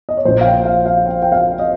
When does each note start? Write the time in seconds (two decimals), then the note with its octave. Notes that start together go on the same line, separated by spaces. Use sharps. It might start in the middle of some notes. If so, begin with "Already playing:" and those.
0.09 D#5
0.17 C#5
0.25 A#1 A#2 F3 C5
0.41 F5
0.45 G5
0.65 F5
0.86 F5
1.06 G5
1.22 G5
1.32 F5
1.59 D#5